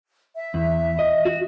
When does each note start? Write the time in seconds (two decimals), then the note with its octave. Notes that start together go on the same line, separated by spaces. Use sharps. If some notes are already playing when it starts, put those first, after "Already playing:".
0.35 E5
0.54 E2
0.99 D#5
1.25 F#4